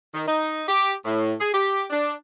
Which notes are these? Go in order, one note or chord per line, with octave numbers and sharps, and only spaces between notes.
D#3
D#4
G4
A2
G#4
G4
D4